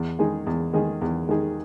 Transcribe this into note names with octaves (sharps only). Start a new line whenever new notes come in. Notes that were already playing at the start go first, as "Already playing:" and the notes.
Already playing: E2
D#3 G#3 D#4 G#4
E2
D#3 G#3 D#4 G#4
E2
D#3 G#3 D#4 G#4